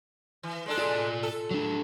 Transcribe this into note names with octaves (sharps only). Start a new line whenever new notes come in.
E3
G#3 D4 A4
F4 D5
A4
F#3 D4